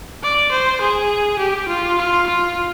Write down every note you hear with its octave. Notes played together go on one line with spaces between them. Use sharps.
D5
C5
G#4
G4
F4
F4
F4